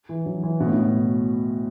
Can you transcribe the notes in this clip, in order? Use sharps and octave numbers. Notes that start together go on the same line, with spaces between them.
E3
F#3
E3
B2
A2
B2